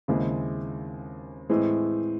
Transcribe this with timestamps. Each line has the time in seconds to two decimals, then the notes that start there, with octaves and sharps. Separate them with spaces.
0.08 D#2 C#3 G#3 C4 E4
1.49 A2 E3 G#3 C4